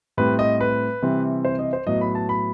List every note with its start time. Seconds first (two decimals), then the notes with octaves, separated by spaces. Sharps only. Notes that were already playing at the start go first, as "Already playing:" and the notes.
0.17 A2 G3 C4 B4
0.39 D#5
0.61 B4
1.02 C3 E3 G3 C4
1.45 C5
1.59 D#5
1.73 C5
1.87 A2 F#3 B3 D#5
2.01 B5
2.15 A5
2.29 B5